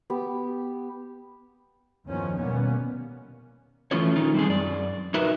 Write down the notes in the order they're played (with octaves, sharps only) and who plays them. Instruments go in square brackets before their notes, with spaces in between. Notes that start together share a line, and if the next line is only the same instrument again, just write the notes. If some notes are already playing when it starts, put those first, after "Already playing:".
[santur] B3 G4
[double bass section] E2 G2 D#3 F3 B3 C#4
B2 D#3 G3 A#3 B3 C#4
[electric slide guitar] E3 A3 C#4 F4 C#5
D#3 D#4 F4
G3 C4 G#4
F#2 D5
D#4 F#4 A#4 B4 E5